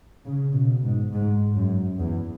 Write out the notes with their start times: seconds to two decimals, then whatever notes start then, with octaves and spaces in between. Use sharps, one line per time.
0.25 C#3
0.54 B2
0.83 G#2
1.12 G#2
1.56 F#2
1.99 E2